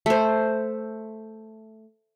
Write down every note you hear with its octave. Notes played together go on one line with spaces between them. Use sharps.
A3 C5